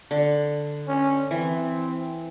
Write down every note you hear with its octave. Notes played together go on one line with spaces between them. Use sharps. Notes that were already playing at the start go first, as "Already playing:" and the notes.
D3
C#4
E3 C4